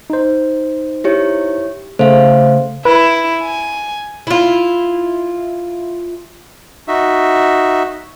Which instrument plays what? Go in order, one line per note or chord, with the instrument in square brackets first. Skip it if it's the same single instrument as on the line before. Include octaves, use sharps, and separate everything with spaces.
[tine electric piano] D#4 C5
[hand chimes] E4 G4 C#5
[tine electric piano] C#3 A3 [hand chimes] C5 F5
[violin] E4 [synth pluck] B4
[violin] G#5
[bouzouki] E4 F4
[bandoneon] D#4 F#4 E5